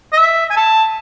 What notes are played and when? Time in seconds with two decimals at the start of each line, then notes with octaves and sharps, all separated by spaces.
0.12 D#5
0.17 E5
0.50 G#5
0.57 A5